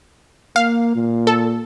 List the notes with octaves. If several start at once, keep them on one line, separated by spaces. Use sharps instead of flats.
A#3 F5
A#2
A4